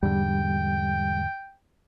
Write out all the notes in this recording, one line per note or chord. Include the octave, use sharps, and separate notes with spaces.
E2 G#2 D3 G3 G5